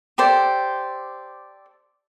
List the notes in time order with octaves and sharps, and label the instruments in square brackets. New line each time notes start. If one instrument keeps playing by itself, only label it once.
[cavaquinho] G4 A4 C5 D5